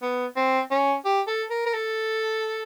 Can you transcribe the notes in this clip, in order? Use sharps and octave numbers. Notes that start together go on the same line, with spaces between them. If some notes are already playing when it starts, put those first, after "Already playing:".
B3
C4
C#4
G4
A4
A#4
A#4
A4